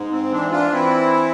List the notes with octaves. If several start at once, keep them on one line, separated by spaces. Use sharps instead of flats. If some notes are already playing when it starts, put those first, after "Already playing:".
Already playing: G#2
C4
E3 D4
D4 F4
E3 C4 E4